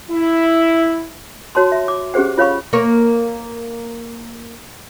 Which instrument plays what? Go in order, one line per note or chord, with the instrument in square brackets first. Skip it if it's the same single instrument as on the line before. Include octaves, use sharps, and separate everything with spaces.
[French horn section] E4
[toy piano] F#4 C#5 A5 C6
E5
D6
C#4 G4 G#4 C5 F#5
F4 C#5 F5 B5 C#6
[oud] A#3 A#4 C#5